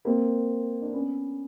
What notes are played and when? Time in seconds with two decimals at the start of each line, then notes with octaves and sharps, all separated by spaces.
0.05 A#3 C4
0.81 D4
0.93 B3 C#4